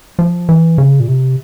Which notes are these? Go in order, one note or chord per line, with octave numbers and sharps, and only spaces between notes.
F3
E3
C#3
A#2
C3